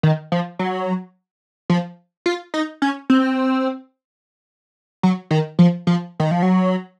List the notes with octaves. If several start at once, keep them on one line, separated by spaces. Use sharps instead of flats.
D#3
F3
F#3
F3
F4
D#4
C#4
C4
F#3
D#3
F3
F3
D#3
F3
F#3